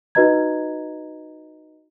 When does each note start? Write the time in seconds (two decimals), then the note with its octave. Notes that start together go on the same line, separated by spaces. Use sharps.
0.15 D#4 F#4 B4 D#5 A#5 G#6